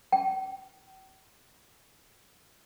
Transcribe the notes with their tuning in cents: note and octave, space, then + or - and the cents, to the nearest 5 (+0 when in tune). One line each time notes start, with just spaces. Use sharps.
G5 -45